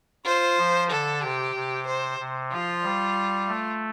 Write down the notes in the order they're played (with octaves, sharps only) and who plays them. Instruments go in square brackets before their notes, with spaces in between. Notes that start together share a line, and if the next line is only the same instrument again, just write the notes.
[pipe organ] F4 [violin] C5
[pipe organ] F3
[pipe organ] D3 [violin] A4
[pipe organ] C3 [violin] G4
[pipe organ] C3
[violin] C5
[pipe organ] C3
[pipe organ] F3 [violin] F4
[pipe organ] G3
A3